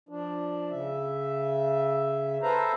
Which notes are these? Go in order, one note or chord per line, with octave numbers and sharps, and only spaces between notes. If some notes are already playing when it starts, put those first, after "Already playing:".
F3 D4
C#3 E5
A4 B4 C5 E5 F5 A#5